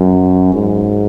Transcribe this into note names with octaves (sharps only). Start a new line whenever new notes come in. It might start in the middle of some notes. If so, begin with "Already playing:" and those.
Already playing: F#2
G#2